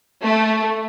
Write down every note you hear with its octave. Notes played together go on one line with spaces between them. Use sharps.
A3